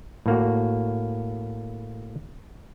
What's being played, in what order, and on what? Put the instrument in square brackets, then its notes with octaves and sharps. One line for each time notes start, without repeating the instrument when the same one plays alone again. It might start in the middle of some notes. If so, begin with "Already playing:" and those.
[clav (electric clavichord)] A2 A#3 F#4